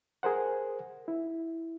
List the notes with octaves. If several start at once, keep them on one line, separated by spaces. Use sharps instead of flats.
G#4 A#4 C5 F#5
E4